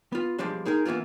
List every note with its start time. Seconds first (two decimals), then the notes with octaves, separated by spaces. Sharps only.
0.12 B3 F4
0.38 B1 F3 G3 G#3 D4
0.65 G#3 D#4 G#4 A#4
0.85 E3 F3 A#3 B3 F4